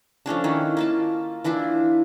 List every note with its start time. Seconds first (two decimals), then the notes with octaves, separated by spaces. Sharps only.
0.26 F3 A3 C#4 D4
0.44 D#3 C#4 E4
0.77 A#3 F4 A5
1.44 E3 D4 E4 F4